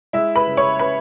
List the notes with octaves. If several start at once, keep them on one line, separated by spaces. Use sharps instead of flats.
G#3 E4 E5
B4 B5
C#3
C#5 C#6
C#4 B4 B5